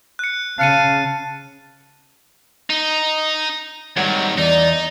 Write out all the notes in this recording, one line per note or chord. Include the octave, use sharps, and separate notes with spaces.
F#6 C#7
C#3 F5 A5 F#6 C#7 D#7
D#4
G#2 D#3 G3 C#5 F#5
E2 D#4 D5